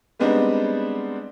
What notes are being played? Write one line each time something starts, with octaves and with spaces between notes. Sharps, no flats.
G3 G#3 B3 C4 D4 D#4